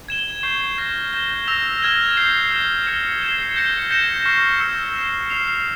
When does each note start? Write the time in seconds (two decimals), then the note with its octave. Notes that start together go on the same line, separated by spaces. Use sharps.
0.08 G#6 E7 G7
0.43 C#6 G6 C7
0.78 F6 A#6 E7
1.13 G6 A#6 E7 G7
1.48 E6 A#6 F7
1.82 F6 G#6 E7 G7
2.17 G6 C7 E7
2.52 F6 A#6 E7 G7
2.86 F6 G#6 C#7 G7
3.22 G#6 C7 E7 G7
3.56 G6 A#6 C#7 G7
3.91 G6 A#6 C#7 E7
4.26 C#6 F6 C7
4.60 E6 G6 A#6 C#7
4.95 F6 C7 E7 G7
5.30 F6 C7 F7